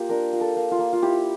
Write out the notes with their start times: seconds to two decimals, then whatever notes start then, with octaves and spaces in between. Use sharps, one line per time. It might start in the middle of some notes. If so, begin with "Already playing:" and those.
Already playing: A#3 F4 G4
0.09 D4 A#4
0.33 F4
0.41 A4
0.56 A#3
0.71 F4
0.79 A#3
0.93 F4
1.02 E4 G4